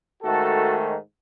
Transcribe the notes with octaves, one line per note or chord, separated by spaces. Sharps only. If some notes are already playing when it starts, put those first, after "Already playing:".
G#2 D#3 A3 F#4 A4